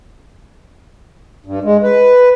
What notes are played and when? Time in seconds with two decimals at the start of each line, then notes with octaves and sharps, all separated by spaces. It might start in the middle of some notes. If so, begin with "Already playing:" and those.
1.46 G2
1.64 G#3
1.83 B4